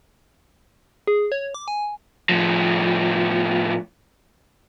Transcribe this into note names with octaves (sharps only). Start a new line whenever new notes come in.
G#4
C#5
D6
G#5
A2 F3